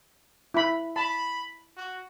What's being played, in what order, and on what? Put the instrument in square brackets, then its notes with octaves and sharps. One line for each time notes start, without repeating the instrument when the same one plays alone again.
[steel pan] E4 B5
[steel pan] A5 [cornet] B5
[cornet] F#4